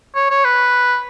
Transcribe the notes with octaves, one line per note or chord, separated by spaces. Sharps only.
C#5
C#5
B4